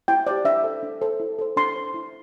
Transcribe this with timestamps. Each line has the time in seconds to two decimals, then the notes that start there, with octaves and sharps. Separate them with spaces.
0.08 E4 G5
0.27 G4 C5 D5
0.45 D4 E5
0.64 A4 C5
0.83 D4
1.01 A4 C5
1.20 E4
1.39 A4 C5
1.57 D4 C6
1.76 C5
1.94 E4